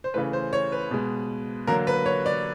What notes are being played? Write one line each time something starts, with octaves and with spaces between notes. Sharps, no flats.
C5
C#3 E3 A3 B4
C5
C#5
B4
B2 G#3
D3 F#3 A#3 A#4
B4
C#5
D5